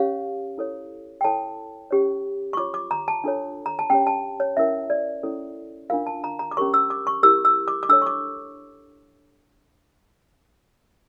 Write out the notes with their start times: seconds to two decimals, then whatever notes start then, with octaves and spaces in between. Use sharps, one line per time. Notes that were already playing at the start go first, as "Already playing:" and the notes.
Already playing: C#4 G4 C#5 F5
0.58 E4 A4 C#5
1.21 G5
1.24 E4 A4 C#5 A5
1.91 C#4 G4 C#5
2.53 C#6
2.57 F4 C#5 D6
2.74 D6
2.91 A#5
3.08 A5
3.24 D4 F4 A4 C#5
3.66 A#5
3.79 A5
3.90 C#4 G4 C#5 G5
4.07 A5
4.40 C#5
4.57 C#4 E4 A#4 E5
4.90 D5
5.23 C#4 E4 A4 C#5
5.90 D4 F4 A#4 F5
6.07 A5
6.24 A#5
6.39 A#5
6.51 D6
6.57 C#4 G4 A#4 C#5 C#6
6.74 E6
6.90 D6
7.07 C#6
7.23 E4 G4 A#4 E6
7.45 E6
7.68 D6
7.83 D6
7.89 D4 A4 C#5 E6
8.02 C#6
8.06 D6